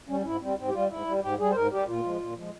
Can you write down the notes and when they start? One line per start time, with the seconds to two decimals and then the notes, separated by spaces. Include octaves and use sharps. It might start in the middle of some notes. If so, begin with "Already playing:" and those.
0.08 G3 C#4
0.20 C#4
0.24 G#2 E4
0.42 G3 C4
0.58 G#2 C4
0.68 G4
0.73 G3 F4
0.90 G#2 E4
1.07 G3
1.23 G#2 G4
1.40 G3 G#4
1.51 C5
1.55 G#2 A#4
1.72 G3 G4
1.88 A#2 F4
2.04 F3 G#3
2.21 A#2
2.36 F3 G#3